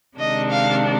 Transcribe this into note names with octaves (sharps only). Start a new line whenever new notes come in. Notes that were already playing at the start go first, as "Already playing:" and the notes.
C3 D#3 G#3 D4 D#5
F5